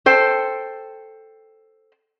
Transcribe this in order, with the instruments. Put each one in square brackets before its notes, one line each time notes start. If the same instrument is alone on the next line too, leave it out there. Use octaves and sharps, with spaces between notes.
[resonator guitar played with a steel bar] A4 C5 G5